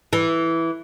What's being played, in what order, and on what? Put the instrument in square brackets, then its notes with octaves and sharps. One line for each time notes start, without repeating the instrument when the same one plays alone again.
[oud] E3